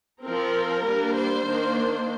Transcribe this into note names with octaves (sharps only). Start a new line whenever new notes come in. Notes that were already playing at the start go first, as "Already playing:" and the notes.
F3 C4 A#4
G3 A#3 D4
C5
D#3 A#3 D4